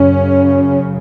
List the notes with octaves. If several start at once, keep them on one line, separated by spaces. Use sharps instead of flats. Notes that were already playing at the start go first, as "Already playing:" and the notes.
Already playing: F#2 C#3 C#4